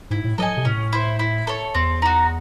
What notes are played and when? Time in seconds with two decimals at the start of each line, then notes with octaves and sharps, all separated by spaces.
0.10 G#2 E4
0.24 A2
0.38 F#3 A4 D#5 G#5
0.57 C3
0.65 A2 C#4
0.93 E4 C5
1.19 E4
1.47 A4 C#5
1.74 E2 C4
2.02 D#4 F#4